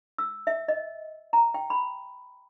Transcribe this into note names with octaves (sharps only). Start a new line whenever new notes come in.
E6
E5
D#5
A#5
G5
B5